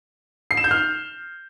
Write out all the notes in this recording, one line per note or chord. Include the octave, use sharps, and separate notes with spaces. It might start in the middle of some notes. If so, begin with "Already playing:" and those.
C7
E7
G6
F6